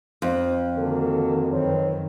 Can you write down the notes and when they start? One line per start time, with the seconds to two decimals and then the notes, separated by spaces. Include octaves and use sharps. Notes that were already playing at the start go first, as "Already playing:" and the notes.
0.22 F2
0.76 D3 D#3 A#3 F#4 A4
1.52 F#2 D#3 C4 B4 C#5